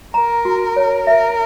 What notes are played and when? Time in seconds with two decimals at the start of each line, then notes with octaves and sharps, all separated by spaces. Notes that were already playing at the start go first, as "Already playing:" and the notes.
0.14 A#4 A#5
0.45 F#4
0.76 C#5
1.07 A#4 E5